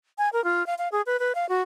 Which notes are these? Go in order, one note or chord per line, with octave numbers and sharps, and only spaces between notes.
G#5
A#4
F4
F5
F5
G#4
B4
B4
F5
F#4